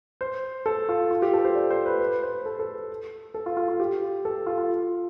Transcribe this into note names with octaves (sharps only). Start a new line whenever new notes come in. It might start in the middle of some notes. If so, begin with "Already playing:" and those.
C5
A4
F4
F4
G4
A4
C5
D5
C5
B4
B4
C5
A4
A4
A4
F4
F4
F4
G4
A4
F4
F4